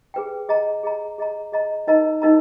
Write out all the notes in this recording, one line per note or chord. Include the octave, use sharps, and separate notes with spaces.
G#4 B4 G5
G#4 D#5 A#5
G#4 D#5 A#5
G#4 D#5 A#5
G#4 D#5 A#5
D#4 A#4 D#5 A#5
D#4 A#4 D#5 A#5